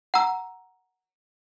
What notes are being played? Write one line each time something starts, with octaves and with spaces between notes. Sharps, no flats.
F#5 A#5 E6